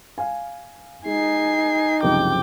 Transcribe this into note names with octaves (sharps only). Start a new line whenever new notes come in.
F5 G#5
G#3 D#4 G#5 C7
F#1 C2 F3 G5 D6